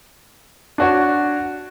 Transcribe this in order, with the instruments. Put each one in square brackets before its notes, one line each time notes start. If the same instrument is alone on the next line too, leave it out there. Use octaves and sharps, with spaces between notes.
[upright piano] D4 F#4 C#5